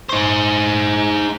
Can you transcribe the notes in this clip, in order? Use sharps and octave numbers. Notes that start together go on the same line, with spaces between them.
D#4 C5